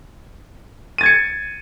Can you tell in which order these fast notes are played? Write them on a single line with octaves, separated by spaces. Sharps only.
D#7 A6 G#6 C#7